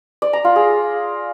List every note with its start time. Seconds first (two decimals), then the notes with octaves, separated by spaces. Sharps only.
0.22 D5
0.33 A#5
0.44 F4
0.56 G#4